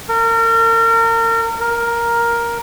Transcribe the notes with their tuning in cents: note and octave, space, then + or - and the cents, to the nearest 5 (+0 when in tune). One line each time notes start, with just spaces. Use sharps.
A#4 -35
A#4 +5